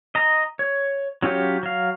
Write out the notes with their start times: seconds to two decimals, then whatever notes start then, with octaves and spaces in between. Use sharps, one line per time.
0.15 D#5 A#5
0.59 C#5
1.22 F#3 C#4 F4 G4 C#5
1.63 F#3 F5